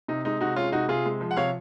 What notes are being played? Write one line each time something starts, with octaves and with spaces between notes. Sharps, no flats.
C3 D#4
G#3 D#4
C3 D#4 F#4
G#3 C#4 F4
C3 D#4 F#4
C3 F4 G#4
G#3
F3
F#5
C3 C#5 F5